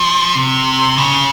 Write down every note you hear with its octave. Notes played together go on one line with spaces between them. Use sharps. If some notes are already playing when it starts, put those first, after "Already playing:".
Already playing: F3
C3
C#3